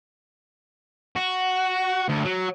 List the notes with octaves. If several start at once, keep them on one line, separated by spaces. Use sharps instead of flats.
F#4
D2
F#3